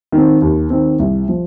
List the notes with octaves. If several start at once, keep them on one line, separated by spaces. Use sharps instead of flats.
D#3 C4
D#2
D#3 C4
C2
F3